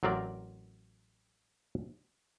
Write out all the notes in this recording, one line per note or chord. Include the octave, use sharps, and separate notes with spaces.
A1 F#3 C4 A#4 D5